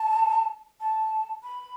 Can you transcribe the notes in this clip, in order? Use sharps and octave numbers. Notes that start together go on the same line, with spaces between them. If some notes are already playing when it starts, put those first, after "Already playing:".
Already playing: A5
A5
B5